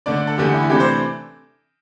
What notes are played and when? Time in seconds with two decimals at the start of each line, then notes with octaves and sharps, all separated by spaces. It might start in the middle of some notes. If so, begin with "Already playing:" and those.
0.06 D3 A3 D4 D5
0.17 D5
0.27 A4
0.38 E2 D3 A3 G4
0.54 E4
0.70 C3 E3 A3 D4 G4
0.80 C5